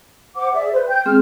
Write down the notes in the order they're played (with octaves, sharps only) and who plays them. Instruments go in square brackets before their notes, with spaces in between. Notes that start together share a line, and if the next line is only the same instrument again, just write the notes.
[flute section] C5 F#5 D6
G#4 D5 E5
B4 C5
G5 G6
[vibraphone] G#3 C4 G#4 [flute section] F6